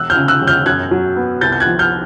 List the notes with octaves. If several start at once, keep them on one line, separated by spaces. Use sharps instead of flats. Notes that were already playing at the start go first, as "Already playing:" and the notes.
Already playing: E1 E6 F#6
F6 G6
C#3
E6 F#6
E1
F6 G6
F#2 F#6 G#6
F#3
B3
C2 G6 A6
G6
F#6 G#6
F3
F6 G6